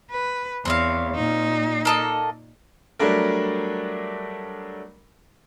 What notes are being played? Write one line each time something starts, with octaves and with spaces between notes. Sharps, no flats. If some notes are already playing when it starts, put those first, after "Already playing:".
B4
E2 C4 C#5 F5
A#2 D#4
A#3 A4 D#5
F#3 G3 A3 D4 A#4